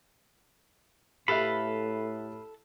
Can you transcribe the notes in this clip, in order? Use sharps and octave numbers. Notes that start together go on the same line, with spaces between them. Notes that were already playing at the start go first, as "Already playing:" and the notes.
A2 G4 A4 B4 E5 F5 B5